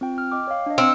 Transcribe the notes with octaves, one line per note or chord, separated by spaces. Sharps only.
C4 F4 G5
F6
D#5 G5 D6
C#5 F5
D4 D#5
C4 F6 C#7